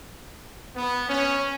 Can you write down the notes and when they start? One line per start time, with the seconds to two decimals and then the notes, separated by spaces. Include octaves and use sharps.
0.75 B3
1.10 C#4